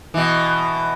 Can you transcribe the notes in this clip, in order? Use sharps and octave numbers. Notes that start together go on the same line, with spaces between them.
B2 E3